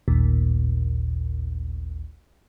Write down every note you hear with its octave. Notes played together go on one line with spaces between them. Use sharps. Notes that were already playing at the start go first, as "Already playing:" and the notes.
A1 D#2 A#2